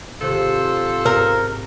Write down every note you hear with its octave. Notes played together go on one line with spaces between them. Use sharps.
G#1 C3 F4 A4 C5 F#6
G#2 A#4